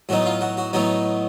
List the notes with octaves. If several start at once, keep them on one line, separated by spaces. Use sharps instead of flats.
A2 F#3 B3 D#4 F#4
F4
F#4
F#4
A2 F#3 B3 D#4 F#4